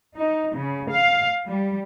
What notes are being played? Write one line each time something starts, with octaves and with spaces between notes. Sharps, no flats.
D#4
C#3
F5
G3